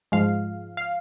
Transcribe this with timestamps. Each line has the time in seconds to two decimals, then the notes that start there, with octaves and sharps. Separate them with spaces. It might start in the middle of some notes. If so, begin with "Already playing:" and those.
0.12 G#2 F3 G#3 F5
0.77 F5